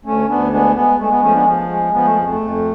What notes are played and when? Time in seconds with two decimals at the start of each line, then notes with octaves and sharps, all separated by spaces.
0.05 D2 A3 C#4
0.29 D2 B3 D4
0.52 G#3 B3 D4
0.75 G#3 B3
0.99 G#3 A3
1.10 B3
1.22 F3 A3 C#4
1.34 B3 D4
1.46 F3
1.69 G#3
1.93 F3 B3
2.05 A3
2.17 F2
2.30 A3
2.40 F2